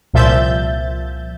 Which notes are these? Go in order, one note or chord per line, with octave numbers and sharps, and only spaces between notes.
C2 A#2 F3 E5 G6 A6